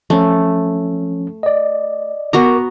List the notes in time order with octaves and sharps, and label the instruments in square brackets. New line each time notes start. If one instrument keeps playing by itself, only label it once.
[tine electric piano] F3 C#4 [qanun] A3
[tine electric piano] D5 D#5
[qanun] B3 F#4 A#5 [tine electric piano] A#4 C#6 D6